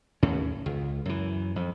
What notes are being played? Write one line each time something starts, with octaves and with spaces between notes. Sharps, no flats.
D#2 A2 C#4
C#2
F#2 E3
F2